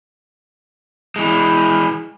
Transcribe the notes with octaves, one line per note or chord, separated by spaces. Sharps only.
E3 G#3